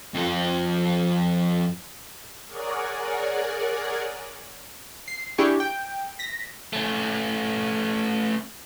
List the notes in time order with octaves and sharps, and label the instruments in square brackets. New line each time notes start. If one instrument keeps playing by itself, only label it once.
[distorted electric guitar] F2 A4
[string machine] G#4 A#4 C#5 D5 F#5 G#5
[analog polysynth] C7
D4 E4 G4 G#4 C#6
G5
A#6 B6
[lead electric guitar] A3 C#4